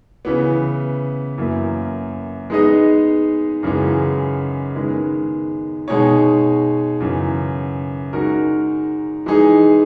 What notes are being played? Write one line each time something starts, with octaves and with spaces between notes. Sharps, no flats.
C#3 E3 B3
F#2 E3 A#3 E4
G#3 B3 D#4 G#4 D#5
F#2 C#3 E3 G#3
D#3 G#3 B3
B2 G#3 D#4 G#4 C#5
F#2 C#3 E3
G#3 D#4 F#4 A#4
E3 G#3 D#4 G#4